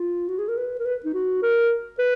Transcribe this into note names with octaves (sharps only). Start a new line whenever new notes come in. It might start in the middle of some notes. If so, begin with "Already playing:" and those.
Already playing: F4
F#4
G#4
A#4
B4
A#4
B4
D#4
F#4
A#4
B4